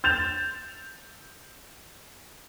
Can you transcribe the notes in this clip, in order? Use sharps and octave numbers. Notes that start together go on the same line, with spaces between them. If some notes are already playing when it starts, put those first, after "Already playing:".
G6 A6 E7 F7